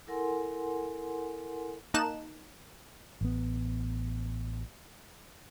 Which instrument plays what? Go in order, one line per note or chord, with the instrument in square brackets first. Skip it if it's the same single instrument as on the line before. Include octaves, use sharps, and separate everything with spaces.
[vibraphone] E4 A4 A#4 F#5 G#5 C6
[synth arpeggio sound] A#3 D#4 A5 F#6 E7
[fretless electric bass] A1 B3